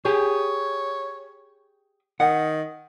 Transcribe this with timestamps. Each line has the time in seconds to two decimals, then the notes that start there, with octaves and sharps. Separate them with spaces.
0.05 G4 G#4 C#5
2.20 D#3 F#5